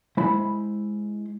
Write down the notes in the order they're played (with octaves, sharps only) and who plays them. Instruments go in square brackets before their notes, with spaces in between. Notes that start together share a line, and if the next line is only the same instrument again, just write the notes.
[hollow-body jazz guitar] G#3 E4 C5 B5